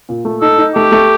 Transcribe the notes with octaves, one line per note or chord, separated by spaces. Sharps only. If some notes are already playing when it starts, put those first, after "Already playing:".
A#2
A3
D#4 A4
D#4
A3 G4
A3